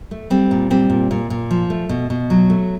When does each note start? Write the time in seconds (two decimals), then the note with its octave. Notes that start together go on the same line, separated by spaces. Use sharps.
0.11 A3
0.30 G3 C4
0.51 A#2
0.70 G3 C4
0.90 A#2
1.11 A#2
1.30 A#2
1.51 F3
1.70 A3
1.89 B2
2.10 B2
2.30 F#3
2.50 A3